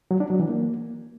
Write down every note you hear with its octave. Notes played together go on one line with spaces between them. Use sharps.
F#3
D4
F#3
E3
A#3